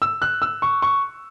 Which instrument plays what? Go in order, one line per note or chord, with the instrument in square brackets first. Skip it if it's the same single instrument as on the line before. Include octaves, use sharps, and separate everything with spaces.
[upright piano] E6
F#6
E6
C#6
C#6